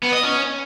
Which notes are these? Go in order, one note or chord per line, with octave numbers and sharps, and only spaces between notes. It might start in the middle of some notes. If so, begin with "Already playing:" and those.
B3
D#5
C#4